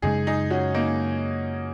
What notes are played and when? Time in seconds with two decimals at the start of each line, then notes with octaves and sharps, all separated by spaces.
0.02 F#2 C#3 G#3 D#4 G#4
0.27 D#4 G#4
0.50 C#4 F#4
0.74 A#3 D#4